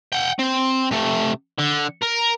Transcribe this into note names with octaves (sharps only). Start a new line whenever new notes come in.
F#5 G5
C4
C3 A3
D3
A#4